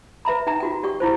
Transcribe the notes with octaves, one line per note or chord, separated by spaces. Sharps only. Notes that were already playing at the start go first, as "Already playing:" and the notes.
B4 E5 A#5 B5
D#4 E5 G5 A#5
F4 F#4 G5
G4 D5 G5 C#6
E4 F4 C5